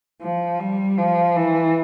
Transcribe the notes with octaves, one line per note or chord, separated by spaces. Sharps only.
F3
G3
F3
E3